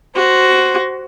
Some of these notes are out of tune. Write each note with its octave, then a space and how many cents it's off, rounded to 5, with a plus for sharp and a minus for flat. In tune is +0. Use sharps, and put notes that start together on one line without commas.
F#4 +10 C5 +0